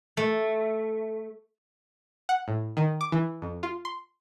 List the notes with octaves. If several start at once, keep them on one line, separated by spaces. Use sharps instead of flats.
A3
F#5
A2
D#3
D6
E3
F2
F4
C6